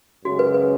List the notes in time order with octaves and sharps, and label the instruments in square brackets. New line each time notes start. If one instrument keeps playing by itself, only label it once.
[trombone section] F#2 C#3 G#3 [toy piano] F#4
[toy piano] B4
B4